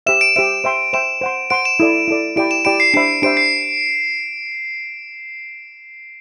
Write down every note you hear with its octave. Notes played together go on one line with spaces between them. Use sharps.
G4 C5 E5 E7
D7
G4 C5 E5 D7
C5 E5 G5 C6
C5 E5 G5 C6 E7
C5 F#5 C6
C5 F#5 C6 D7
E7
E4 A4 D5
E4 A4 D5
E4 G4 D5 G5 B5 D7
E7
E4 G4 D5 G5 B5 D7
C7
D4 G4 C5 E5 B5 C7
D4 G4 C5 E5 B5 D7
C7